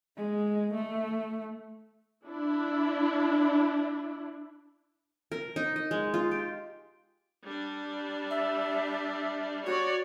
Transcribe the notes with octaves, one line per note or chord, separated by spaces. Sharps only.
G#3
A3
D4 E4
A#4
D#4
D#5
G#3
F4
G4
G3 D4
E5
F#4 C#5 D5